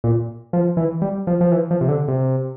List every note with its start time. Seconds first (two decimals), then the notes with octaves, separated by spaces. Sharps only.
0.04 A#2
0.53 F3
0.77 E3
1.02 G3
1.27 F3
1.41 F3
1.52 E3
1.71 F3
1.81 C3
1.89 D3
2.08 C3